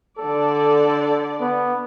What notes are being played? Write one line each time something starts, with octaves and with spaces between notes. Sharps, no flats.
D3 A4 D5
B3